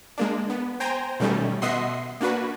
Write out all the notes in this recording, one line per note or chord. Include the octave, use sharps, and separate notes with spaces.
G#3 A#3 D4
B3
C5 G5 G#5 A#5
B2 D#3 G3 A3 C#4
B2 D#5 E5 F#5 C6 C7
A#3 D4 F#4 B4